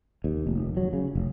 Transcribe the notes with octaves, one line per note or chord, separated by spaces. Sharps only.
D#2
F1
F#3
C#3
F1